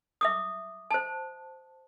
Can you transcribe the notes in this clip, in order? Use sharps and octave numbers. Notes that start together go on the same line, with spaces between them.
E5 D6 D#6
C5 A5